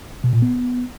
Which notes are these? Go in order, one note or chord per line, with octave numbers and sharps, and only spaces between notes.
B2
A#2
B3